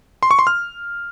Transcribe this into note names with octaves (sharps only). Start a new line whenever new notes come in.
C6
C#6
C6
F6